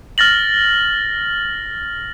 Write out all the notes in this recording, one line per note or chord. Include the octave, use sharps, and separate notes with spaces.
F6 A6 A#6 F#7